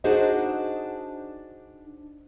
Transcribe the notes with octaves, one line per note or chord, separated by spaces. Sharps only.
D4 D#4 F#4 G#4 C5 D#5